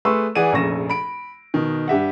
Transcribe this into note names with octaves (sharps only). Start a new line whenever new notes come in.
A3 G#4 B4 C6 C#6 E6
E3 G#4 D5 F#5 D#7
F1 A#1 C#3 C#6 A#6 E7
B5 D7
B2 D#3
G2 G4 E5 F#5